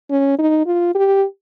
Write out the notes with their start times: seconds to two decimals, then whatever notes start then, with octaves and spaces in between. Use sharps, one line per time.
0.10 C#4
0.38 D#4
0.66 F4
0.95 G4